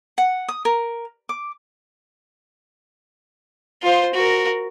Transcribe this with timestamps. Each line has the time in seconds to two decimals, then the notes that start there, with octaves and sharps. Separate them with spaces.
0.18 F#5
0.48 D#6
0.65 A#4
1.29 D6
3.82 F4 C5
4.14 F#4 A#4